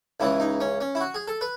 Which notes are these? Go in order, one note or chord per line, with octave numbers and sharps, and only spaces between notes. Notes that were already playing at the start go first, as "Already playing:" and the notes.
C#2 C#3 E3 E4
D#4
C#4
C#4
E4
F#4
G#4
A4
B4